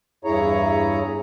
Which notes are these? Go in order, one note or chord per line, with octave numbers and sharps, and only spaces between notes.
E2 G2 E4 G#4 C#5 A#5